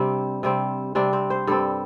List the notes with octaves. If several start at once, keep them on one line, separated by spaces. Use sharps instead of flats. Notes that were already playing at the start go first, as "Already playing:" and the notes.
Already playing: C3 G3 C4 D4
C3 G3 C4
C3 G3 C4 D4
C4
C5
G2 G3 C4 A4